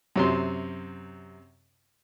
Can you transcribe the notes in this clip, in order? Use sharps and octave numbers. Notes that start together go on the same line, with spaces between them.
F#2 C3 C6